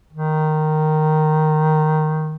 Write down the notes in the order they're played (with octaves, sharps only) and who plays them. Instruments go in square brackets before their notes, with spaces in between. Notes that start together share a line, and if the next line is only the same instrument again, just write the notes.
[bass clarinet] D#3